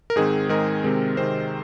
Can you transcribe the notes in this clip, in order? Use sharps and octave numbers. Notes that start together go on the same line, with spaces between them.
A#4
G#2 D#3 G#3 C4 G#4
G#2 D#3 G#3 C4 A#4
C3 D#3 G#3 C4
C3 D#3 G#3 C4 C5